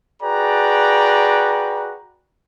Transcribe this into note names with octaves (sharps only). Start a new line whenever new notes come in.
F#4 G#4 B4 D5 G5 A#5